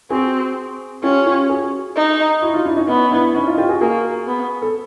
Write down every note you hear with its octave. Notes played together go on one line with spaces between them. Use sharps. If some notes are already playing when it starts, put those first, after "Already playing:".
C4 F#4 G#4
C#4 F4 G4
F4 G4
F#4 G#4
D#4
E4 F#4
D#4 F4
D4 E4
C#4 D#4
B3 C#4 D#4
D4 E4
C#4 D#4
D#4 F4
F4 G4
F#4 G#4
A#3 F#4 G#4
B3
A4